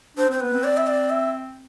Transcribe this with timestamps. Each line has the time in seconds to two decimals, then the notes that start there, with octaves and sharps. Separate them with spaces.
0.17 D4 C5
0.29 C4 C5
0.40 B3 B4
0.54 C4
0.64 D5
0.77 E5
0.87 D5
1.10 E5